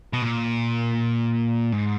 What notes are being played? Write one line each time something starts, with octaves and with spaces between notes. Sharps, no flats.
B2
A#2
G#2